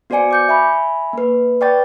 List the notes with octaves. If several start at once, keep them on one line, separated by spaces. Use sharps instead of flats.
B3 F#4 C5 D5 G#5 C#7
D6 G6 C#7
E5 G#5 B5 C#6
A#3 B4
B4 D5 G5 C#6 A6